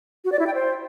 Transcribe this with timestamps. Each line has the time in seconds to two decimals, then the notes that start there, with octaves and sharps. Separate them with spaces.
0.25 F#4
0.32 D5
0.39 E4
0.47 G5
0.54 C5